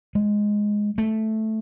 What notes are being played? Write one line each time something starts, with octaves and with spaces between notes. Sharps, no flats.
G#3
A3